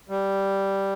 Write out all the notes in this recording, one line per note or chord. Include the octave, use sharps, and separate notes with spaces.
G3